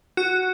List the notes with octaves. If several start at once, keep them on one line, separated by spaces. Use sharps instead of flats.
F#4